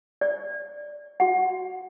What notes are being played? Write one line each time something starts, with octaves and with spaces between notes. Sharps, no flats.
D5
F#4 F#5